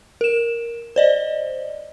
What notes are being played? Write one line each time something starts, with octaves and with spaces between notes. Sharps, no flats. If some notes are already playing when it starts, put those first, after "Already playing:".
A#4 E7
C5 D5 D#5